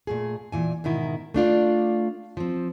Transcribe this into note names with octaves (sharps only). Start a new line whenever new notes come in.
A#2 A3 G#4
A#2 E3 G#5
G#2 B2 D#3 E4
A3 D4 F4 D5
F3 C4